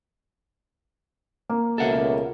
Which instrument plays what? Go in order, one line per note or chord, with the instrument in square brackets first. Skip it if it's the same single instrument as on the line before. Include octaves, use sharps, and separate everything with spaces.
[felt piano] A#3
[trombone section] C#2 B2 [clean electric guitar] A4 A#4 F#5 [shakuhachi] E5